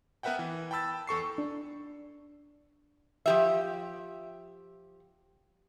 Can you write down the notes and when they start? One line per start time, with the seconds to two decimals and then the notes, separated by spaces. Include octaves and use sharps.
0.23 B3 A#4 B4 E5 F#5 G5
0.39 E3
0.71 G5 A5 B5 E6 A6
1.07 E2 A4 C#6 C7
1.38 D4
3.26 F3 G4 E5